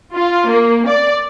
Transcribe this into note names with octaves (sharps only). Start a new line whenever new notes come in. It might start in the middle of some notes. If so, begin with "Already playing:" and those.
F4
A#3
D5